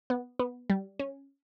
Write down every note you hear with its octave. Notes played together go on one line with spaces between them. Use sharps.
B3
B3
G3
C#4